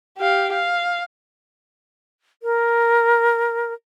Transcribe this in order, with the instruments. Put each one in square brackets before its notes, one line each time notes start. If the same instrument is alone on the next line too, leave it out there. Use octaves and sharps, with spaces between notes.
[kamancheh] G4 F5
F5
[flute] A#4